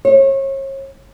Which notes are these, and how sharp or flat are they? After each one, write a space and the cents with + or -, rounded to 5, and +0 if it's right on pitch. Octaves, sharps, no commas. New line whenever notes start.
C#5 -35